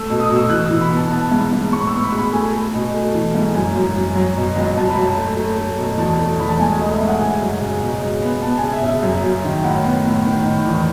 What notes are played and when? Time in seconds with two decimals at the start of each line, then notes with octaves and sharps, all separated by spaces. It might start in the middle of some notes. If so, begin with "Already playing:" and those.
Already playing: A3 E6
0.10 B2
0.20 D#6
0.30 B2
0.36 E6
0.50 E3 F#6
0.65 E6
0.71 E3
0.81 B5
0.90 B3
0.96 A5
1.11 B3 A5
1.31 G#2
1.52 G#2
1.73 A2 C#6
1.87 B3 E6
2.03 B5
2.12 G#3
2.18 B5
2.33 A3 G#5
2.53 A3
2.74 B2
2.95 A3
3.15 E3
3.35 G#2
3.55 F#2 G#5
3.76 F#2
3.95 F#2
4.16 F#3
4.37 B2
4.56 C#2
4.77 F#2 A5
4.90 B5
4.97 F#2 A5
5.18 A3
5.37 A3
5.58 A3
5.79 B2
5.98 E2 A5
6.19 A3
6.40 E2 B5
6.49 A5
6.59 G#2 G#5
6.79 A3 D#5
6.94 E5
7.00 G#2
7.08 F#5
7.21 C#3 G#5
7.40 F#2
7.61 C#3
7.81 B2
8.02 G#3
8.22 B3
8.42 B3 A5
8.58 G#5
8.63 C#3
8.73 E5
8.83 C#3
8.89 E5
9.03 F#2
9.24 F#2
9.44 D#3
9.64 A2 F#5
9.84 B3
10.05 A2
10.26 D#3
10.45 D#3
10.66 E2